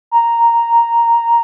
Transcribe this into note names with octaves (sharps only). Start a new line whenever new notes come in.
A#5